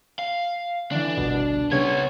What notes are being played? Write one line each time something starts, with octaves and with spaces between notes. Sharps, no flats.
F5
D3 E3 D4
G1 C2 B2
C2 C#3 B3 C#5 G#6